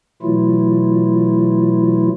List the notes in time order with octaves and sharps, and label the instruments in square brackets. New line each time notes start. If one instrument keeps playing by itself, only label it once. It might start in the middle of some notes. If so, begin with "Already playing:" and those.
[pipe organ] B2 E3 F#3 A3 E4 F4